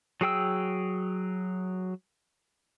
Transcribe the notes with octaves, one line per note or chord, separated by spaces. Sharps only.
F#3 G#4 G5 E6